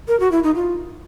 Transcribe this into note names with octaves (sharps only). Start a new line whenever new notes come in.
A#4
F#4
E4
D#4
F4